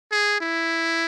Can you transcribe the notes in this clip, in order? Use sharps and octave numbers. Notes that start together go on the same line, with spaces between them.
G#4
E4